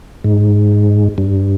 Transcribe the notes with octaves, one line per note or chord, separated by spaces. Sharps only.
G#2
G2